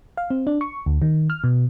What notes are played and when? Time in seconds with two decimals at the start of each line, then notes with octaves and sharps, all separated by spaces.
0.17 F5
0.30 C4
0.47 D4
0.61 C#6
0.86 D2
1.02 D#3
1.30 F6
1.44 B2